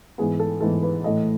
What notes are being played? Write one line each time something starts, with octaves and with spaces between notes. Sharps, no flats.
G#2 E3 B3 G#4
A4
G#2 E3 B3 A4
B4
A2 E3 A3 D#5